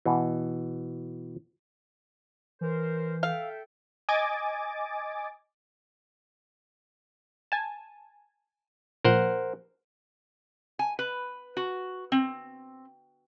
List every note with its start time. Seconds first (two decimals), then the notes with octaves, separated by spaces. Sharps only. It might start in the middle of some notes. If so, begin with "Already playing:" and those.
0.06 B2 E3
2.61 E3 A#4 C5
3.23 A4 E5 F5 G5
4.09 D#5 G#5 D6 A6
7.52 G#5 A5
9.05 A#2 F3 A#4 C5 F#5
10.79 G#5
10.99 B4
11.57 F#4
12.12 C4